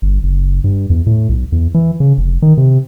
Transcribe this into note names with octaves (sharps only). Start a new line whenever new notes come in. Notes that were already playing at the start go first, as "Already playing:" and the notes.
G1
F#1
G2
E2
A2
B1
E2
E3
C#3
F1
D#3
C3